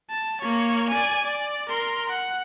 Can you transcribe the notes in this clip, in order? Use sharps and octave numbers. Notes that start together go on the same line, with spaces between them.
A5
A#3 C#5
D5 G#5
D5
A#4 C6
F#5